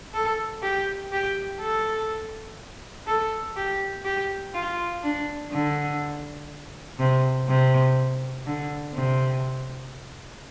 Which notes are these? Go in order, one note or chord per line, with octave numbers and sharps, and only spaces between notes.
A4
G4
G4
A4
A4
G4
G4
F4
D4
D3
C3
C3
D3
C3